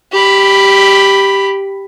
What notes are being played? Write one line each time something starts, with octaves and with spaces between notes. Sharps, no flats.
G4 B5